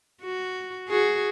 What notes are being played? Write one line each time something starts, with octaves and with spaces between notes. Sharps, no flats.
F#4
F#4 G#4